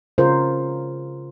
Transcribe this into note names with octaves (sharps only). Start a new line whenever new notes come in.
C#3 F4 A#4 C5